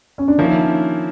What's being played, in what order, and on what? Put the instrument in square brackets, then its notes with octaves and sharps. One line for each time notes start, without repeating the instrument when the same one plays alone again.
[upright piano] C#4
D4
[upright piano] D#3 D#4 [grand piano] F3 A#3 C#4 E4